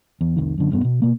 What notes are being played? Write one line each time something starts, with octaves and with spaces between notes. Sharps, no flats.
E2
F1 C2 D#3
F#2 D3
E1 G2 B3
B2
B2 A#3